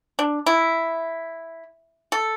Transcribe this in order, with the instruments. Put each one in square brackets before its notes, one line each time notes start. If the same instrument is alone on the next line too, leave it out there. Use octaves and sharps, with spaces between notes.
[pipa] D4
E4
A4